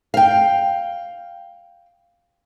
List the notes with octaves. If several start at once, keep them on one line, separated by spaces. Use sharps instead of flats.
F5 G5